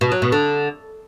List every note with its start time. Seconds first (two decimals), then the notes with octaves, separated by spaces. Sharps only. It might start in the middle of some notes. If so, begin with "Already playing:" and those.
0.01 B2
0.12 F#3
0.22 B2
0.32 D3